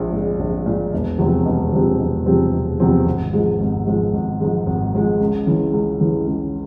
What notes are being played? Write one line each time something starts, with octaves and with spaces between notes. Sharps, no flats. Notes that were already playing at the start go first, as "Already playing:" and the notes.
Already playing: A#1 A#2 G#3
A#2 G#3
A#1
A#2 G#3
E1
E2 C3 F3 C4
E1
E2 C3 F3 C4
E1
E2 C3 F3 C4
E1
E2 C3 F3 C4
G#1
G#2 F3 G#3
G#1
G#2 F3 G#3
G#1
G#2 F3 G#3
G#1
G#2 F3 G#3
C#2
C#3 E3
C#2
C#3 E3
C#2